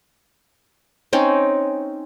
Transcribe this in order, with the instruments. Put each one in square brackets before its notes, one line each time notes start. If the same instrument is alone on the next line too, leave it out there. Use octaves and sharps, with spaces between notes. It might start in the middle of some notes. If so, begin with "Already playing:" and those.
[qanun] C4 C#4 D#4